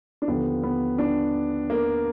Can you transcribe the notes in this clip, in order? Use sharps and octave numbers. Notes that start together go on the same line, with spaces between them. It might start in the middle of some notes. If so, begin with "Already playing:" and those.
D4
D#2 D3 F3 B3
B3
D4
A#3